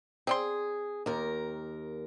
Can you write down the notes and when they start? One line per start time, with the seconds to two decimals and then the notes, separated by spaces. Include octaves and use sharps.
0.27 C4 G#4 D5 C6
1.06 D#2 A#4